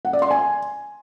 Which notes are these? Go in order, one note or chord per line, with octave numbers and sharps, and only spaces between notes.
F#5
D5
C6
G#5